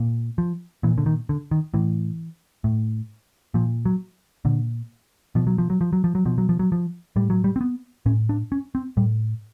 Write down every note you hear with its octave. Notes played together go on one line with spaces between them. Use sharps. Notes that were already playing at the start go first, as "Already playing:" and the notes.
Already playing: A#2
F3
A#2 E3
D3
D#3
D3
D#3
A2 E3
A2
A#2 F3
F#3
A#2 D3
B2 F3
F#3
F3
F#3
F3
F#3
F3
F#3
B2 F3
F#3
F3
F#3
F3
A2 G3
F#3
G3
C4
B3
A2 C#4
D4
C#4
C4
A2 G3